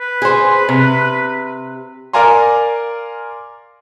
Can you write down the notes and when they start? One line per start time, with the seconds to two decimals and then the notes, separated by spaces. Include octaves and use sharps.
0.01 B4
0.22 G#4 C5
0.69 C3
2.13 A#4 D5 F5 G#5 A#5 C6